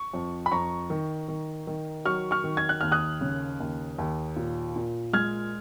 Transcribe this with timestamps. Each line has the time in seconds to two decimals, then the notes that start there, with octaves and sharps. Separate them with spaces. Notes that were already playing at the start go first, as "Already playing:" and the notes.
Already playing: C#6
0.14 F2
0.46 B5
0.51 F2 A#5 C#6
0.90 D#3
1.28 D#3
1.67 D#3
2.05 F#3 C#6 F6
2.31 C#6 F6
2.44 D#3
2.57 G#6
2.69 F#6
2.81 D#2 F6
2.92 D#6 F#6
3.21 C#3
3.60 D#2
3.98 D#2
4.36 A#2
4.76 A#2
5.13 G#3 F6 G#6